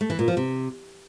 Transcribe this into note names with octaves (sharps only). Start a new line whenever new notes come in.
A3
E3
A#2
F3
C3